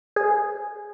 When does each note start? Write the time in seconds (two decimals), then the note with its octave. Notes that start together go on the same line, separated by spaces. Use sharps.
0.16 G#4